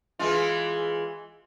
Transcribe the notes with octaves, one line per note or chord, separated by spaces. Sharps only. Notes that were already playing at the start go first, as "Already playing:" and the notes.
E3 G#3 F4